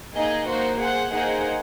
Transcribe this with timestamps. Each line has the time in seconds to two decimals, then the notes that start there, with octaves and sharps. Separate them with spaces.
0.15 A#3 D#4 G#4 D#5
0.48 A#3 D#4 F#4 C5
0.80 G#4 C5 F#5
1.12 A#3 D#4 G#4 C5 F#5